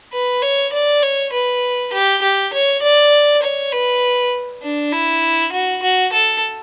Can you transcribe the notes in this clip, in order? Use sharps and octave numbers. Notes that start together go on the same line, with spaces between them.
B4
C#5
D5
C#5
B4
G4
G4
C#5
D5
C#5
B4
D4
E4
F#4
F#4
A4